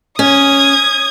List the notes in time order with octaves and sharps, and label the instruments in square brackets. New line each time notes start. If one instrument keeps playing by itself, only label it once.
[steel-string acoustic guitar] C#4 [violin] D#6 G#6